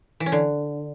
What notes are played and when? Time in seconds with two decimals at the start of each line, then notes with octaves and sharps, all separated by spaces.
0.20 E3
0.26 C#4
0.32 D3